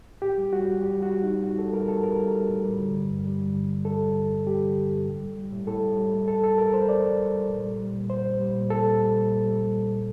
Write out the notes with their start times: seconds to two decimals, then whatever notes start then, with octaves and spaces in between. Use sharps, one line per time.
0.22 A2 G4
0.38 G3
0.52 G3 F#4
0.67 A2
0.82 A2 G4
0.98 G3 F#4
1.13 G3
1.24 D#4
1.28 A2
1.43 A2 F#4
1.59 G3 A4
1.73 G3 A#4
1.88 A2 A4
2.03 A2 A#4
2.20 G3
2.34 G3
2.49 A2
2.65 G3
2.79 D3
2.95 G2
3.10 G2
3.25 G3
3.40 D3
3.55 G2
3.71 G2
3.85 G3 A4
4.01 D3
4.16 G2
4.31 G2
4.47 G3 G4
4.61 D3
4.76 G2
4.91 G2
5.07 A2
5.22 G3
5.37 G3
5.52 A2
5.67 A2 A4
5.82 G3
5.97 G3
6.13 A2
6.27 A2 A4
6.43 G3 A4
6.58 G3 A#4
6.74 A2 C5
6.89 A2 D5
7.04 G3
7.18 G3
7.34 A2
7.48 A#2
7.64 G3
7.79 G3
7.94 A#2
8.10 A#2 C5
8.25 G3
8.40 G3
8.55 A#2
8.70 A#2 A4
8.86 G3
9.00 G3
9.16 A#2
9.31 A#2
9.45 G3
9.61 G3
9.76 A#2
9.91 A#2